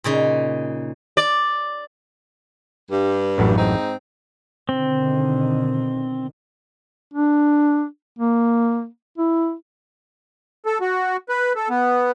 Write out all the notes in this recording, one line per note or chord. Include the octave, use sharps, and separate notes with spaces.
A#2 C#3 D#4
D5
G2
A1 F#2 A2
G#2 C4 D#4
B2 D3 D#3 C4
D4
A#3
E4
A4
F#4
B4
A4
B3